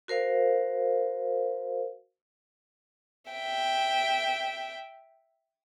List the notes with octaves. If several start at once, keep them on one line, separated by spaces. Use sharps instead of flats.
F#4 A#4 C5 F5
E5 G5